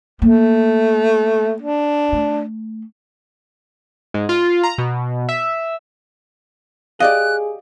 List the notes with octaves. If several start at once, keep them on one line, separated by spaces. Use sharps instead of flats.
A3 A#3
D4
A3
G#2
F4
A#5
B2
E5
G4 G#4 D5 D#5 F5 F#6